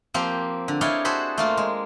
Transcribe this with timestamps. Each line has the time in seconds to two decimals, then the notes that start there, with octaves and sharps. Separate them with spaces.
0.14 F3 A#3 C4 G4
0.68 D3
0.81 D4 E4 C#5 D#5 F5 G5
1.05 F#4 G#4 A4 C5 B5
1.38 A3 A#3 F4
1.57 G#3